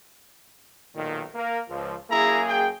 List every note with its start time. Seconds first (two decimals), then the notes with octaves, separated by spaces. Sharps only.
0.94 B1 A#2 D#3
1.35 A#3 A#4
1.69 C#2 F3
2.10 F#2 A#3 E4 G#4 A#5
2.46 G5